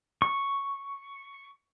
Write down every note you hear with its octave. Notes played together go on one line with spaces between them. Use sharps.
C#6